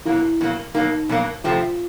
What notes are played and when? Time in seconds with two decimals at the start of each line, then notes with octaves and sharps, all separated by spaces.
0.06 B2 F#3 A#3 E4
0.41 B2 F#3 A#3
0.74 B2 F#3 A#3 D#4
1.09 B2 F#3 A#3
1.44 C3 F3 A3 C4 F4